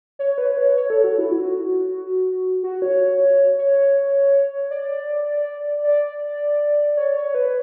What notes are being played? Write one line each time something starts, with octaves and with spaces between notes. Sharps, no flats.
C#5
B4
C#5
C#5
A4
F#4
E4
F#4
F#4
C#5
C#5
D5
D5
C#5
C#5
B4